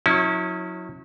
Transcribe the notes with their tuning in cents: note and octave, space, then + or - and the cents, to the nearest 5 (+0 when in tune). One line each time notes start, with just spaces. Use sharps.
F#3 -35 C#4 -10 E4 -35